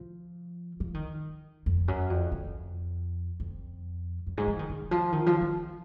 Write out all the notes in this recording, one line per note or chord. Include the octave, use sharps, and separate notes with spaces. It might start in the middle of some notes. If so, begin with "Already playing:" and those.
Already playing: F3
F3
D#3
F2
F#2
F2
F2
F2
F#2
G#2
F3
D#3
D#3
F3
D#3
F3
D#3